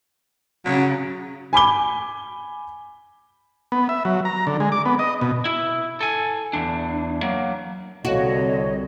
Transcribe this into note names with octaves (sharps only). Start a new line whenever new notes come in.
C#3 F#3
G#5 B5 D6 G7
B3
E5
F#3
A#5
D3
G#3
D6
B3
D#5
B2
E4
A4 G#5
E2 D4
F#3 A#3
C2 D3 F#4 C#5 D#5